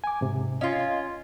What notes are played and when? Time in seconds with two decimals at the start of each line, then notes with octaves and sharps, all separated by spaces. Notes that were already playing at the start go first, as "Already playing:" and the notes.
0.04 G#5 D6
0.21 G#2 C3
0.61 C#4 F4 D#5 F5 C6